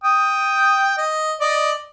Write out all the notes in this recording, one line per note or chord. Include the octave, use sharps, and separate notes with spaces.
G5 D#6
D#5
D5 D#5